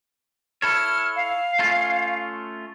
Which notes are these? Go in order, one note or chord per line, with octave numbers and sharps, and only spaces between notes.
E4 A4 C#5 F6
F5
A3 C#4 F4